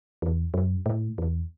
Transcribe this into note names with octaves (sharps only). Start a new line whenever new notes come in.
E2
F#2
A2
E2